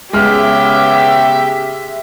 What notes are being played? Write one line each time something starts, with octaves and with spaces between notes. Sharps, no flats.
C#3 G#3 B3 G4 E5 F6